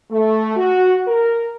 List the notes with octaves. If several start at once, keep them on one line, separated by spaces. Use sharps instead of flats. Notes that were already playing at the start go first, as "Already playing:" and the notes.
A3
F#4
A#4